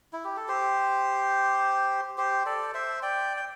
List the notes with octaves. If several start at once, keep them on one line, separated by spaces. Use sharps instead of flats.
E4
G4
A4
G4 C5
G4 C5
A4 D5
C5 E5
D5 G5
G5